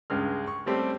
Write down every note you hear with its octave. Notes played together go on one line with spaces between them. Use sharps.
C#2 G2 G#3 F6
C#6
G3 A3 C4 C#4 G4